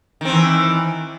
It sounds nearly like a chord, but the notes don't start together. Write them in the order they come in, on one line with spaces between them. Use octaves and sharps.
D#3 C4 E3